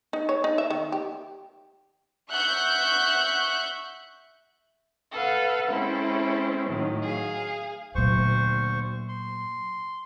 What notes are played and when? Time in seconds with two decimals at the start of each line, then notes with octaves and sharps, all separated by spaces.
0.13 D#4
0.29 C#5
0.44 D#4
0.58 E5
0.70 D#3
0.92 G4
2.30 E5 F#5 C#6 F#6 G6
5.12 A4 B4 F5 F#5
5.69 G#3 C4 C#4 E4 A4
6.69 A2 D#3 F#3
7.02 G#4 F5
7.95 D2 A#2 F#3 C5 C#6
9.09 C6